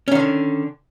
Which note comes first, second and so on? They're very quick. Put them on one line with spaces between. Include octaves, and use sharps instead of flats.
C#4 D#3 D3